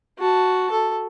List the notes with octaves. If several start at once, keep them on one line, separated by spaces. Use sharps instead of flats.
F#4 A5
A4